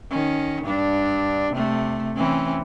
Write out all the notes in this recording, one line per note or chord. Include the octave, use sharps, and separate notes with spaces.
D#3 C#4
G2 D4
C3 A3
E3 C4 C#4